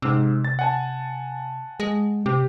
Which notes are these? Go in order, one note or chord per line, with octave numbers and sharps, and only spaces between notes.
G#2 C3 E6
A6
F#5 G#5 A5
G#3
C3 G4